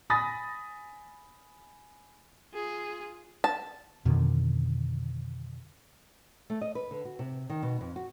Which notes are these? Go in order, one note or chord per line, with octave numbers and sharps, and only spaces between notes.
G#5 B5 D#6 A6 A#6
F4 G#4
A5
F2 B2 D3 D#3
A3
D#5
B4
D3
F#4
C3
D#3
B2
F2
F#4